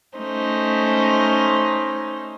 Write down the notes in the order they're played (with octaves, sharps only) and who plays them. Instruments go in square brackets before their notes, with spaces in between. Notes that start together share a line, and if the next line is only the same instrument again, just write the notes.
[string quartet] A3 C#4 D#4 C5